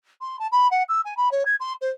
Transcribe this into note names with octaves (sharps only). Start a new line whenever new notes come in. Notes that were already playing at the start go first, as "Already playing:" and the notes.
C6
A5
B5
F#5
E6
G#5
B5
C#5
G#6
C6
C5